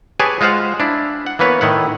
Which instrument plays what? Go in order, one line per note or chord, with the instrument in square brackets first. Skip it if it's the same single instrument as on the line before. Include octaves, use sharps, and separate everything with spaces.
[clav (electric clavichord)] G4 G#4 B4 C#5 G#5 A5
G#3 F4 C5 F5 F#5
D4 E4
F#5
E3 A#3 B3 B4 C#5
A2 D#3 E4 F#5